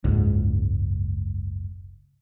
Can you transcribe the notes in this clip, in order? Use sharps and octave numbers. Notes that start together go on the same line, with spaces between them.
F#1 C#2 G#2